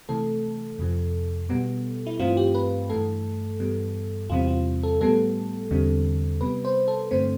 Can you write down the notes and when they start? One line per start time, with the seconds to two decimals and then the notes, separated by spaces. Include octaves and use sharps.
0.09 C3 E3 A3 A4
0.79 F2 C3 F3
1.49 B2 G3 B3
2.06 E4
2.19 G2 E3 A3 C4 F4
2.37 G4
2.55 B4
2.89 G2 E3 A3 A4
3.60 G2 E3 G3 B3
4.30 E2 C3 E3 G3 C4 F4
4.47 F4
4.83 A4
5.01 A2 G3 B3 A4
5.71 E2 D3 G3 C4
6.41 C3 G3 B3 B4
6.65 C5
6.88 A4
7.11 G2 D3 A3 C4 C5